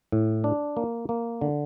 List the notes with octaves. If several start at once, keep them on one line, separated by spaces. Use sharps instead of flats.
A2
D4
A#3
A#3
D3